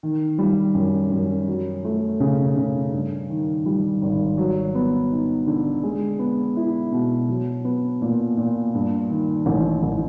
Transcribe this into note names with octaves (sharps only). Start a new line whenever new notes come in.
D#3
G3
F#2
F#2
F#3
A3
C#3
C#3
G2
D#3
G3
G#1
F#3
B3
D#4
D3
G#3
B3
E4
B2
F#3
B3
A#2
A#2
G2
D#3
A1
A1